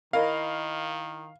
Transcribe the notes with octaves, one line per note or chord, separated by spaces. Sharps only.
D#3 E4 A#4 D#5 F5